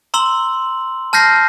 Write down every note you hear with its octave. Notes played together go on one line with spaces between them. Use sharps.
A#5 C6 E6 F#7 G7
A5 F6 G6 A#6 C7